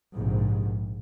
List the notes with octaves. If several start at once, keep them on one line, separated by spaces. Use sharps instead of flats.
A#1 G#2 C3